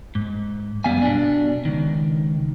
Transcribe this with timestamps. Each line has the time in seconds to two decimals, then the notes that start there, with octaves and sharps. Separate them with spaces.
0.15 G#2
0.84 F#2 E3 G3 B3 F5 G#5
1.02 B2 D4
1.65 C#2 D#3